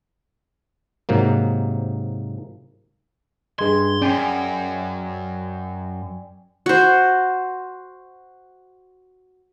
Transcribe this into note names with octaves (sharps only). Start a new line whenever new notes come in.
G#2 C3 F#3 A#3
G2 G#4 D#5 C6 G#6
F#2 C#4 D5 G5 G#5
F#4 C5